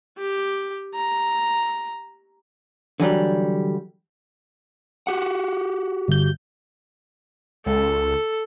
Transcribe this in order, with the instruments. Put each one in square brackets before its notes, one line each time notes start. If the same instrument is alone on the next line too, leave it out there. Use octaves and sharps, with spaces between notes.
[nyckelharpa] G4
A#5
[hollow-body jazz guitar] D3 E3 F#3 G3
[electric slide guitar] F#4 G4 F#5
[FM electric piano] G1 G6
[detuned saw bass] C#2 [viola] A4